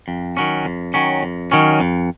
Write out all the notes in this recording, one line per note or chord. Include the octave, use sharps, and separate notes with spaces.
F2
D#3 F#3 C#4
F2
D#3 F#3 C#4
F2
D#3 F#3 C#4
F2